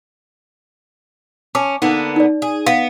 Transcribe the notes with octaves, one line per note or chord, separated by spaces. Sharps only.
C#4 A5 D6
D3 A#3 B3 D#4
D#4 D5
G#4
B3 F5